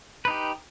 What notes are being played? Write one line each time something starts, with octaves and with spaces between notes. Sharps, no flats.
D#4 G4 B4